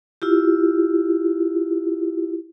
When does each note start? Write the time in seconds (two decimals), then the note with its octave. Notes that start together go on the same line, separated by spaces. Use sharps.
0.22 E4 F4 G4